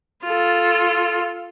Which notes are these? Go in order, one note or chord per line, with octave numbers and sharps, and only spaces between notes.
F4 A4